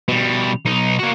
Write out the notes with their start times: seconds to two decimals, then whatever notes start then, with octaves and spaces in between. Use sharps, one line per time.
0.08 B2 G3
0.65 B1 D#4
0.99 A#3 F#4